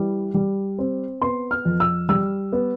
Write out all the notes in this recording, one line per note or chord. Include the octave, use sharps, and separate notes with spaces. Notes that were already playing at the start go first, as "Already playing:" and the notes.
Already playing: E3 G3
G3
C4
B3 C6
F6
F2
E6
G3 E6
B3